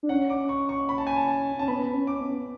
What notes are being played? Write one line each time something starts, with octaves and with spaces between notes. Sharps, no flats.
D4
C#4 F#5
D6
C#6
C#6
B5
A5
G#5
A5
A5
C#4 A5
B3 B5
C#4
D6
B3